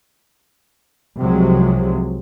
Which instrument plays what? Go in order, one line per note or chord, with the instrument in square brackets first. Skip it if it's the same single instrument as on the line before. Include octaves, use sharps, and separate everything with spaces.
[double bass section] C2 C3 F3 F#3 G#3